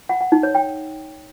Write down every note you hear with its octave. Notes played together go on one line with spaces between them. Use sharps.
F#5
F#5
D#4
C#5
G5